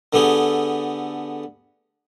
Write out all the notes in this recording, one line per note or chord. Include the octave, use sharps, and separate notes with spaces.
D3 A3 B3 G4 G#4